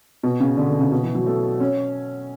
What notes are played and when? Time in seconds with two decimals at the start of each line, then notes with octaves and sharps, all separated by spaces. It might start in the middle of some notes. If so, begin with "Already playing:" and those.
0.23 B2
0.40 C#3
0.57 D3
0.69 D3
0.80 C#3
0.92 B2
1.03 E3
1.15 F#3
1.26 A3
1.60 C#4